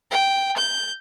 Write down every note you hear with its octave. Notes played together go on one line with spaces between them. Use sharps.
G5
G6